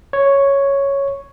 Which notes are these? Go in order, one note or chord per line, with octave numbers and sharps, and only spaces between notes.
C#5